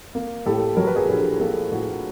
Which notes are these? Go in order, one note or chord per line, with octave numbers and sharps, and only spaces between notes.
A#3
A2 G4 A4
F#3 A#4
B4
G#4 A#4
A#1 G4 A4
A#3 G4 A4
A2 F#4 G#4